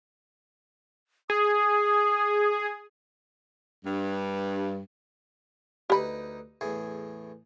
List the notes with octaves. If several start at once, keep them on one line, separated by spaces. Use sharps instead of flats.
G#4 D#6
G2
D2 D#4 G4 B4 B5
E2 A2 G#4